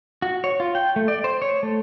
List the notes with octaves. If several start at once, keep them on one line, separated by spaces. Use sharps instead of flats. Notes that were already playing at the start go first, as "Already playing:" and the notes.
F#4
C#5
F4
G5
A3
D5
C5
C#5
A3